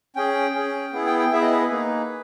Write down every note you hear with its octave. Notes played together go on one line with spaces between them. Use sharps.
C#4 G#4 G5
C#4 G#4
B3 E4 G#4
G5
G5
B3 E4 G#4 E5
D#5
B4
B4
A#3 D#4 G#4